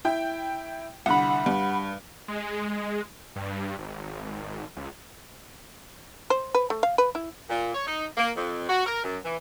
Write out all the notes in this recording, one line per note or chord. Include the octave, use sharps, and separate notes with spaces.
E4 G5
C2 D3 F#5 B5
G2
G#3
G2
G#1
C#2
C5
B4
A3
F5
B4
E4
A#2
C#5
D#4
A#3
F2
F#4
A#4
F#2
E3